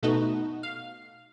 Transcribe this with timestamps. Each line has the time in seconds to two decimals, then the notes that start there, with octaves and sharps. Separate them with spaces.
0.03 B2 A3 B3 D#4 F#4
0.63 F5